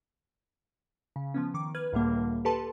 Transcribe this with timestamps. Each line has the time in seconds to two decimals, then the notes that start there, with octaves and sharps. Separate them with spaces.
1.16 C#3
1.34 F3 B3 C#4
1.54 D#3 D6
1.75 B4 F6 G#6
1.93 C#2 A2 D3 G3 A#3
2.45 G4 A4 B4 A5 C6